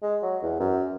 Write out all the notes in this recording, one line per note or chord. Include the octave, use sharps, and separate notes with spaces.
G#3
F#3
E2
F#2